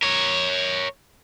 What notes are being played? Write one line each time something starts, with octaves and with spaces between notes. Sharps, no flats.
A#4 C#5